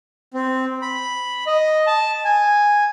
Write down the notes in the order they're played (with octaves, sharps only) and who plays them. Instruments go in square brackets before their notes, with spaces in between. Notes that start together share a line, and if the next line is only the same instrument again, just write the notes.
[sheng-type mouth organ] C4
B5
D#5
A5
G#5